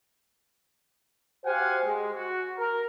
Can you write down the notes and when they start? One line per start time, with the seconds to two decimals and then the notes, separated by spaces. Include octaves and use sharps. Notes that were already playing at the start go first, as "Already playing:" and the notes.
1.45 F#4 G4 C5 F5 F#5 G#5
1.84 G#3
2.13 F#4
2.58 A#4